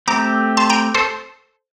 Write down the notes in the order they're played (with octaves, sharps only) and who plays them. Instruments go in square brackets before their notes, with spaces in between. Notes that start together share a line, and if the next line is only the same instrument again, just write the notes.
[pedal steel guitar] A3 C4 G4 [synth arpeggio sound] A#5 D6
[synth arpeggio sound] A5 C6
G5 A#5
A4 C5